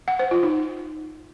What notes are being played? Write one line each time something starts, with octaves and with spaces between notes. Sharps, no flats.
F#5
C5
F4
D#4